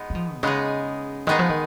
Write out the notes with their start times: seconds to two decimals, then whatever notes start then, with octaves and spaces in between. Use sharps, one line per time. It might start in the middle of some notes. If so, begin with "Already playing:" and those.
Already playing: G#3 B3 D#4
0.10 F#3
0.15 F3
0.35 B2
0.43 C#3 G#3 B3 D#4 G#4
1.27 D#3 G#3 B3 D#4 G#4
1.39 F3
1.49 D#3